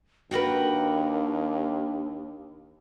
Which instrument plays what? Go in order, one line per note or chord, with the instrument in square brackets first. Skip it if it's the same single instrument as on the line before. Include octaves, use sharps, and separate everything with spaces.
[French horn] D#2 [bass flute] D4 [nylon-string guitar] F#4 B4 [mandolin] A#4 F#5 G5